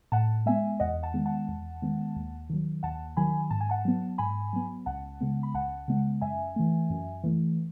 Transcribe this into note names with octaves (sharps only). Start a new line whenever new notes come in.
A2 F#5 A5
G#3 B3 E5 G#5
E2 D#5 F#5
F#5 A5
D#3 G#3 B3
F#5 A5
E2
D#3 G#3 B3
D#2
D#3 F#3
D#2 F#5 A5
D#3 F#3 G#5 B5
G#2 A5
G#5
F#5 A5
F#3 B3
G#2 G#5 B5
F#3 B3
C#2 F#5 A5
C#3 G#3 B3
B5
C#2 F#5 A5
C#3 G#3 B3
F#2 E5 G#5
E3 A3
F#2
E3 A3